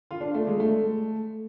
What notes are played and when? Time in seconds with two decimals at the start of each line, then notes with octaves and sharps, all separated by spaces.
0.11 F4
0.21 D4
0.34 A3
0.47 G#3
0.60 A3